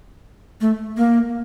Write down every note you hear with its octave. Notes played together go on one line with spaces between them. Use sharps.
A3
A#3